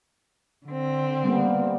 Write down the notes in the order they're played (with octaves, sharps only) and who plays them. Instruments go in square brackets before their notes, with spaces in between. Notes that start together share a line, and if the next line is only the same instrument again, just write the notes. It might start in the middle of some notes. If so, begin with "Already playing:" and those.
[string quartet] D3 C4
[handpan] G3 A#3 B3